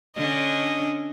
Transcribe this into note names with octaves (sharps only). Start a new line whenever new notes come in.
D3 C#4 D4 D#5